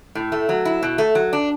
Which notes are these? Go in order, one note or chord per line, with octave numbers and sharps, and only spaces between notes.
A2
A3
F#3
E4
B2
A3
F#3
D4